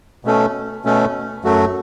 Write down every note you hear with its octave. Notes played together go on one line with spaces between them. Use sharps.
B2 A3 C#4 A4
B2 A3 C#4 A4
F#2 F#3 A3 F#4 A4